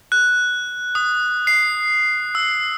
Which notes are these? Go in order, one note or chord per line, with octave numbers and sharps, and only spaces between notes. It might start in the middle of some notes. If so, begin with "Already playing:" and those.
F#6
D#6
C7
E6